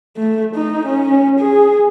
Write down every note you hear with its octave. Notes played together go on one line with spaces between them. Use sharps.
A3
D#4
C#4
G#4